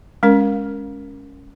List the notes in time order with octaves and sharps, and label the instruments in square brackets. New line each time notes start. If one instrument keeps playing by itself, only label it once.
[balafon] G#3 C#4 A#4